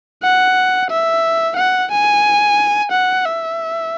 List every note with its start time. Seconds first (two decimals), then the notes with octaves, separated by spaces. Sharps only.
0.23 F#5
0.90 E5
1.57 F#5
1.91 G#5
2.92 F#5
3.25 E5